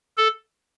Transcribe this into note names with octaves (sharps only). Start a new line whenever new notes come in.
A4